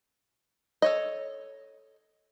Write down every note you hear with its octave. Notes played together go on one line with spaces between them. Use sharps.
A4 C#5 D#5